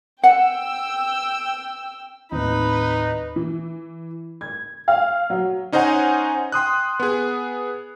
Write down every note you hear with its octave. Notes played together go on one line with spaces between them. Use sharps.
F#5 G5 E6
D#2 A2 D#3 C4 D#4 E4 B4
E3
G#6
F5
F#3
C#4 D#4 C5 D#5 F#5 G#5
G5 C6 D#6 F#6
B3 G#4